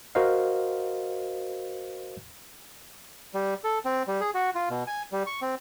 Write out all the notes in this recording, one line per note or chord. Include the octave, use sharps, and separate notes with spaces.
F#4 A#4 C5 D#5 F5
G3
A4
C4
G3
G#4
F#4
F4
B2
G#5
G3
C#6
C4